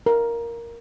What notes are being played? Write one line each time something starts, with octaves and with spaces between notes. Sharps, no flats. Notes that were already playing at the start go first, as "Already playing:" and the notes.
A#4